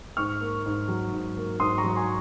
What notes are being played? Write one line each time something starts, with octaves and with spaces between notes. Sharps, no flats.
G#2 C#6 F6
A#3
G#2
F#3
G#2
A#3
G#2 C6 D#6
A#5 C#6
F#3
G#5 C6